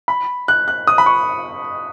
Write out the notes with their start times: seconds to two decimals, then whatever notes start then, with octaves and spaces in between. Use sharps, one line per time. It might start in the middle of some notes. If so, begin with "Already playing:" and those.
0.08 B5
0.48 F#6
0.68 F#6
0.87 D#6
0.98 B5
1.06 C#6